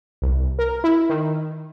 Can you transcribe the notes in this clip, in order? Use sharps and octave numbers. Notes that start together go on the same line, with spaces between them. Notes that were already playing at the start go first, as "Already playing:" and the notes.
C2
A#4
E4
D#3